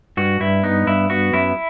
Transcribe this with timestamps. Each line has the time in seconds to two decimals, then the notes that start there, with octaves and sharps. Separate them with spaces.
0.17 G2 F#4
0.40 G2 E4
0.63 B3 D#4
0.87 G2 E4
1.10 B3 F#4
1.33 F#2 E4